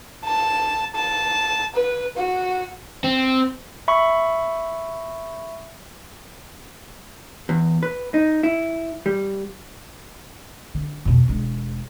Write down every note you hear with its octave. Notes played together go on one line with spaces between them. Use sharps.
A5
A5
B4
F#4
C4
E5 B5 C#6
E2
B4
D#4
E4
G3
D3
F2 B2
E1 G#3